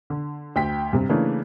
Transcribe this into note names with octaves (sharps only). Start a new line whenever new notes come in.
D3
D2 G5 B6
G2 C3
C#3 E3 A3 A#3 D4